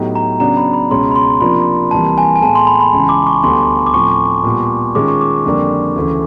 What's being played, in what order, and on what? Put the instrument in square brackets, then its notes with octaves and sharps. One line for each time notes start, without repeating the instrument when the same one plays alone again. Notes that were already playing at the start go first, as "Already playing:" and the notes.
Already playing: [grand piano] A2 F#3 B3 D#4 G4
[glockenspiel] A#5
[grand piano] C#3 F#3 B3 D4 [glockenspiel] A#5
[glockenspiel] B5
B5
[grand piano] C#2 B2 G#3 C#4 [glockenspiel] C6
[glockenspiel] B5
C6
[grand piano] C3 F3 A#3 D4 F4 [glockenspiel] B5
[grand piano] C2 C3 E3 G3 A#3 [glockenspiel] A5
[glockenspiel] G#5
G#5
[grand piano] A2 E3 G#3 B3 [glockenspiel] A5
[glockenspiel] C6
B5
B5
[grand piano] C#2 C#3 E3
[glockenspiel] D6
C#6
[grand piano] D2 D3 G3 B3 [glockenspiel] C6
[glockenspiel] D6
[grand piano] A2 F3 A3 C4 [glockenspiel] C#6
[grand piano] A#2 G3 B3
[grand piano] D#3 G#3 C#4 F4 [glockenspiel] D6
[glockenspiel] C#6
D6
[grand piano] F2 D3 G3 A#3 D4
D2 C#3 E3 A3